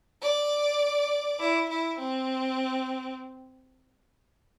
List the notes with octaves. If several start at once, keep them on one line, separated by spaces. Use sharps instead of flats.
D5
E4
E4
C4